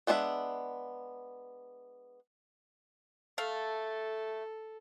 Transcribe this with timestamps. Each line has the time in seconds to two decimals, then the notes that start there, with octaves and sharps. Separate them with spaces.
0.07 G#3 B3 D4 G#4 E5
3.38 A3 A4 F5